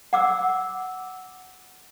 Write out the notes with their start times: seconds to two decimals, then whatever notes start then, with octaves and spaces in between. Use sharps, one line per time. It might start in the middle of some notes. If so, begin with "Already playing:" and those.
0.13 F#5 D6 E6